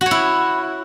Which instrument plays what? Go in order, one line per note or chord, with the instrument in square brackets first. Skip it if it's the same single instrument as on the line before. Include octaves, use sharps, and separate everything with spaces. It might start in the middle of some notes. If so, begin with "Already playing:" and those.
[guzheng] F#4
C#5
E4